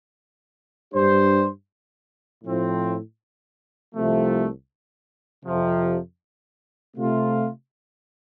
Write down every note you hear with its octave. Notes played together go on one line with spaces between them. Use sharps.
G2 G3 D4 G4 C5
A2 F3 C4
C2 C3 F3 A3
F2 C3 F3
C3 A3 F4